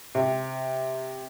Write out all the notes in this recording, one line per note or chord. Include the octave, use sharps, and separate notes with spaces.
C3